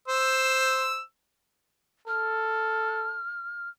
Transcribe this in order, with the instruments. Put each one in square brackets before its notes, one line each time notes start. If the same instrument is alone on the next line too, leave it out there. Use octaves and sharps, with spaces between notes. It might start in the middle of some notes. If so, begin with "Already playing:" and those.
[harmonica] C5 E6
[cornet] A4 [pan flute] F6